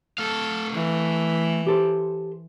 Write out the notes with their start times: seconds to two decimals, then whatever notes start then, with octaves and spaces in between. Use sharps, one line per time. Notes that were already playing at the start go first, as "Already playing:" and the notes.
0.18 A3 A4 F5
0.72 E3
1.67 G4 A4 C5